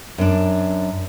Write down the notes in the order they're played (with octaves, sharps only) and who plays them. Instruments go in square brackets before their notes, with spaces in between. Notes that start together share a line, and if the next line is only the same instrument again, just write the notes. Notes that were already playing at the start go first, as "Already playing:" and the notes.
[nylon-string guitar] F#2 D4